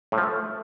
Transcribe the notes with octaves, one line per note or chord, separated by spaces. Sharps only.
A2
F3
A3